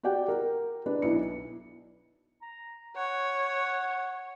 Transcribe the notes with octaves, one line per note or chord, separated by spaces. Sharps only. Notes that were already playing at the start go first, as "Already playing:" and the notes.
F#4 G4 D5 F#5 G5
A#4
D4 B4
B1 E4 C#7
A#5
C#5 F#5